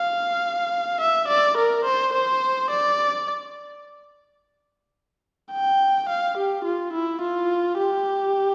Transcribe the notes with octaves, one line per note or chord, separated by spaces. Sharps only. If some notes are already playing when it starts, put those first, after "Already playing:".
Already playing: F5
E5
D5
A#4
C5
C5
D5
G5
F5
G4
F4
E4
F4
G4